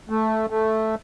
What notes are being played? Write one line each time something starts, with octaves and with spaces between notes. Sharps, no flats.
A3
A3